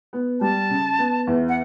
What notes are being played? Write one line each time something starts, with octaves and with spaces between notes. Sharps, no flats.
B3
G3 A5
C#3
B3
E2
F#5